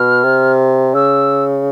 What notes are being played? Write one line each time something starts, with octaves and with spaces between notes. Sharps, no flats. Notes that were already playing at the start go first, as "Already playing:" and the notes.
Already playing: B2 F6
C3
C#3 E6